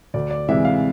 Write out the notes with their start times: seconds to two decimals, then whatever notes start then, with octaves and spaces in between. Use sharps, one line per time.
0.14 D2 D5
0.31 D5
0.49 C3 E3 G#3 E5
0.65 F5